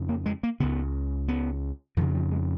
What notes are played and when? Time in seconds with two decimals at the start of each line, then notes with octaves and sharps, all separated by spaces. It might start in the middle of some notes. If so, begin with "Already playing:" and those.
Already playing: F2 C#3
0.09 A#3
0.26 G#3
0.43 A#3
0.60 C#2 C#3 B3
1.28 B3
1.97 F2 D#3
2.01 C#3
2.15 F3
2.31 G#3